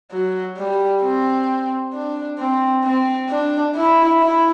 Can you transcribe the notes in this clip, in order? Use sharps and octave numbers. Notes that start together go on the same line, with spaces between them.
F#3
G3
C4
D4
C4
C4
D4
E4
E4